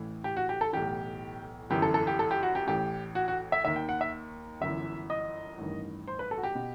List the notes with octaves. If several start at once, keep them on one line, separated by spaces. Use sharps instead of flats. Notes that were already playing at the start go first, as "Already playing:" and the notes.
Already playing: A1 A2 E3
G4
F#4
G4
A4
B1 A2 E3 G4
G1 F#2 E3 G4
A4
A4
G4
A4
G4
F#4
G4
A1 A2 E3 G4
F#4
F#4
E5
D#2 D#3 E5
G5
F#5
E5
G1 F#2 E3 E5
D#5
A1 G2 D#3
C5
B4
A4
F#4
G4
B2